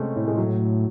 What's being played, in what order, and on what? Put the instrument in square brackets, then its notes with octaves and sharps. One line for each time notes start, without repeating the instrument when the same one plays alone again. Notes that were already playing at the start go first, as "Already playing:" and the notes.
Already playing: [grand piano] C3 G#3 A3 C4 C#4
[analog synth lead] A2
[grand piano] G#3
F#3